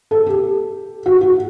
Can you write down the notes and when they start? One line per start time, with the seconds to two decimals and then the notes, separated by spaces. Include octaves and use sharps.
0.11 A4
0.26 G4
1.06 F#4
1.21 F#4